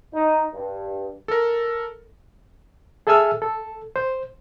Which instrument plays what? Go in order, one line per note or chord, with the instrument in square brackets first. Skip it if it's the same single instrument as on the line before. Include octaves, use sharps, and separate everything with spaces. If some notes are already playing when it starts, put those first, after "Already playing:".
[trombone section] D#4
G2
[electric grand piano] A4 A#4
[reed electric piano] G#4 A4 E5 G#5 E6 F6
A4
C5